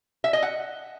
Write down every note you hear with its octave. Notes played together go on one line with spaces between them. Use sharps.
E5
D#5
F#5